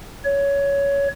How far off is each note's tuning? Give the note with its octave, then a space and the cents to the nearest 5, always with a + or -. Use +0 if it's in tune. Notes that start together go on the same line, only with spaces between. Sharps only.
C#5 +15